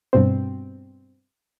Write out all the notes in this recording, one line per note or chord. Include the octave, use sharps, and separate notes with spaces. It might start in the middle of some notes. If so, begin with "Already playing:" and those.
G2 B2 C4